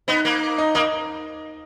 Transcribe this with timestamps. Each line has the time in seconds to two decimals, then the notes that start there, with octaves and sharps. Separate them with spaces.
0.08 B3 D#4 D#5
0.25 A#3
0.58 D#4 D#5
0.75 A#3 D#4 D#5